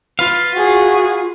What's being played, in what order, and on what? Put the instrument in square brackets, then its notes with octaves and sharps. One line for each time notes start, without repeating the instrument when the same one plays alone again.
[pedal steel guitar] F4 B4 F5
[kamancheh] F#4 G#4